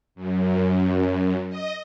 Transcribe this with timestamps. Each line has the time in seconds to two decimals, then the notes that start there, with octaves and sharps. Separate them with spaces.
0.15 F#2
1.49 D#5